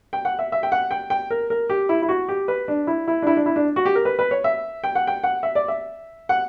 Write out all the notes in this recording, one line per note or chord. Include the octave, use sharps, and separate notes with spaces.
G5
F#5
E5
E5
G5
F#5
G5
G5
A#4
A#4
G4
E4
E4
F#4
G4
B4
D4
E4
E4
D4
E4
D4
E4
D4
F#4
G4
A#4
B4
B4
C#5
E5
G5
F#5
G5
F#5
E5
D5
E5
F#5